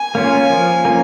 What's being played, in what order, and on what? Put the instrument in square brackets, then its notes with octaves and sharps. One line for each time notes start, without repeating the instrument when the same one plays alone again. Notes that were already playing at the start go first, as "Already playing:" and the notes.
Already playing: [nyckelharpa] G#5
[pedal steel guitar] A#3 C#4 F4
F3
A#3 C#4